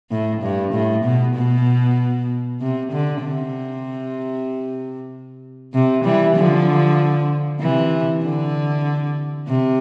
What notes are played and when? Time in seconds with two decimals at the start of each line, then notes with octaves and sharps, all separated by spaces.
0.11 A2
0.42 G2
0.73 A2
1.05 B2
1.35 B2
2.60 C3
2.92 D3
3.23 C3
5.74 C3
6.04 E3 G3
6.36 D3 F3
7.60 C3 E3
8.23 D3
9.48 C3